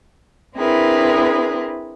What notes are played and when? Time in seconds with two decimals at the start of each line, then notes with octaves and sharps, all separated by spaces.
0.55 C4 D4 E4 G#4 A#4 B4